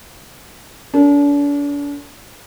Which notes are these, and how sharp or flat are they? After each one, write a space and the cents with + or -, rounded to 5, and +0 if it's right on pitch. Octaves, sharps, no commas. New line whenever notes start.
D4 -40 A#4 -45